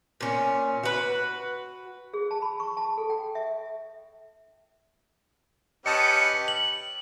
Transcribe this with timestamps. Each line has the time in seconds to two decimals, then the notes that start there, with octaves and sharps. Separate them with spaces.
0.20 A#2 C#4
0.83 F#4 B4
2.14 G#4
2.31 A5
2.42 B5
2.60 C#6
2.77 A5
2.98 A4
3.10 G5
3.35 E5
5.86 C#4 G4 B4 D#5 A5 D#6 C#7
6.48 F#7